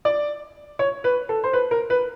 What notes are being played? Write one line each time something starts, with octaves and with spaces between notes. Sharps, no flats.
D5
C#5
B4
A4
C5
B4
A#4
B4